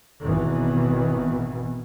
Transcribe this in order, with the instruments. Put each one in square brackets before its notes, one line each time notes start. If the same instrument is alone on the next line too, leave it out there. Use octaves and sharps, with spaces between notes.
[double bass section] G#1 B2 D#3 E3